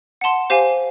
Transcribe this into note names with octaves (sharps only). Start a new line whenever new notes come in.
F#5 A5 C6
G4 C5 F5 G#5